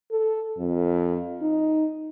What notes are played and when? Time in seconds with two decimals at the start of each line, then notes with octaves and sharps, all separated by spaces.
0.11 A4
0.58 F2
1.41 D#4